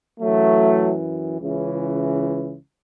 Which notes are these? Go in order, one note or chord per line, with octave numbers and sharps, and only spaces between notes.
F#2 E3 F#3 A3
C#2 C#3 E3